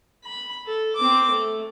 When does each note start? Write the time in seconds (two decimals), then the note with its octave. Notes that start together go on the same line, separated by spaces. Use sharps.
0.24 B5
0.66 A4
0.95 C4 D6
1.31 A3